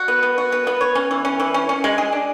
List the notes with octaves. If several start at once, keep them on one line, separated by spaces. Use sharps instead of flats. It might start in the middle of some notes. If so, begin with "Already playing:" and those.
Already playing: F#4
B3
B3
F#4
B3
B3
C#5
C#4
E3
C#4
E3
C#4
C#4
G#3
G#4
D4